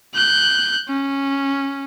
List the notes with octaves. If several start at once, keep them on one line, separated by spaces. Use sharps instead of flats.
F#6 G6
C#4